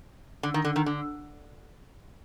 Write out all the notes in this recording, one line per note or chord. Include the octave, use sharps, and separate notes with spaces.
D3
D#3
D3
D#3
D3